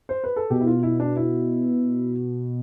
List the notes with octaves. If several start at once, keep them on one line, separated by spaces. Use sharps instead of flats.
C5
B4
A4
B2 G4
E4
F4
E4
D4
E4